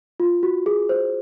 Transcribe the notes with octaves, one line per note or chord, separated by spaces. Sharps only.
F4
F#4
G#4
C5